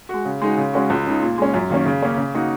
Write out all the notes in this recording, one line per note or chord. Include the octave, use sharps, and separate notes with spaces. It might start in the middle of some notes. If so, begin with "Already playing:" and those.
G#3 F#4
C#3
G#3 D#4 F#4
C#3
G#3 C#4 F#4
C#2
C#3 G#3 D#4
A#2
G#3 C#4
F#2
D#3 A#3 C#4
C#3
A#3 C#4
C#3
A#3 D#4 F#4